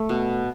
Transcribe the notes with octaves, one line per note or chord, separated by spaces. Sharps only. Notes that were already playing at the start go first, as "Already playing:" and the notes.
Already playing: A3
B2